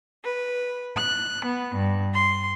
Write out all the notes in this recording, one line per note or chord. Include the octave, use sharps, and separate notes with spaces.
B4
F#6
B3
G2
C6